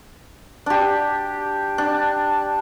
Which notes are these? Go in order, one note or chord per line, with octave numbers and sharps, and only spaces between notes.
D4 G4
D4